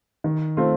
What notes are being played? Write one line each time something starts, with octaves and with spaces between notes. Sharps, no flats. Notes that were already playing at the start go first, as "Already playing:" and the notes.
D#3
A3 C4 F4